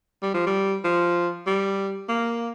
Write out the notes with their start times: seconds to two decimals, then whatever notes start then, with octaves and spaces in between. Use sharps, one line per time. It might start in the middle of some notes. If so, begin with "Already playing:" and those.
0.23 G3
0.34 F3
0.47 G3
0.84 F3
1.47 G3
2.09 A#3